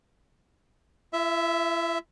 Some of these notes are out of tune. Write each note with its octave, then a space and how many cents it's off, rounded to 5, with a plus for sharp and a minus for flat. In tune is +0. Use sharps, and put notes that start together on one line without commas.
E4 +45 E5 +0